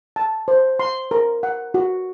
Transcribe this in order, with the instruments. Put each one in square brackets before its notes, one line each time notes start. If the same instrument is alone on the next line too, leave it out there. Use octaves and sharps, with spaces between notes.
[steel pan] A5
C5
C6
A#4
F#5
F#4